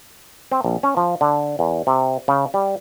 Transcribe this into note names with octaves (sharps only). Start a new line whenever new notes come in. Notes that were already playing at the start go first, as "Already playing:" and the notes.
C4
A#1
C#4
F3
D3
E2
C3
C#3
G3